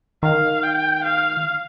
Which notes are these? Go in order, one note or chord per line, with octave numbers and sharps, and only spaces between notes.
D#3 F5
G5
F5